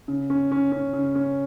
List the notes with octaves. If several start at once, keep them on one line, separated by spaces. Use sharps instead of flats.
C#3
C#4
C#4
C#4
C#3
C#4